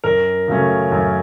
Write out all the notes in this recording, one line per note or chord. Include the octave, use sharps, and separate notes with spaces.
F#2 A#4
C#3 F#3 A3 C#4
F#2